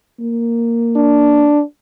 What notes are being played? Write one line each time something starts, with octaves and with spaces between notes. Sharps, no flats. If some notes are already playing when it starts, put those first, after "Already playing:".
A#3
D4